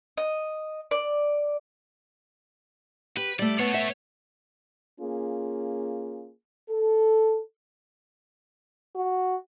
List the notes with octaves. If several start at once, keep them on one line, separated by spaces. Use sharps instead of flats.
D#5
D5
G4 B4
G3 A3 D5
A3 B3 C#5
E5
A#3 C#4 F4 G#4
A4
F#4